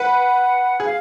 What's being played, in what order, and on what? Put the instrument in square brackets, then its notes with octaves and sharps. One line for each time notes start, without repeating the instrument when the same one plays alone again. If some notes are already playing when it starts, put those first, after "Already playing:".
Already playing: [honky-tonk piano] B4 [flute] F#5
[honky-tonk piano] G#4
[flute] F5